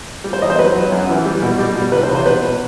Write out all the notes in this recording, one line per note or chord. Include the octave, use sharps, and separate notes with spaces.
G3
C5
E2 D#5
C5
F#3 B4
F#3
F#2
E3
G3
B2
G3
B2
C3 B4
C5
E2
C5
B2 B4
B2